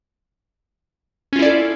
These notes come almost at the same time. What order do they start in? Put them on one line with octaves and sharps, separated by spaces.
C#4 F4 E4 D5 A4